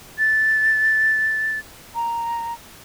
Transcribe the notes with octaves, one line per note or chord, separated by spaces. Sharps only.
A6
A#5